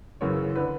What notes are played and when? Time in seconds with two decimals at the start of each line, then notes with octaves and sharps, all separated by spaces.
0.21 F#2 C#3 E3 C#5
0.56 D3 B4